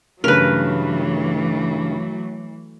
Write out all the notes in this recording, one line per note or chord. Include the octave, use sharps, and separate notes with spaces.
G2 C#3 E3 F#3 A3 A#4 B4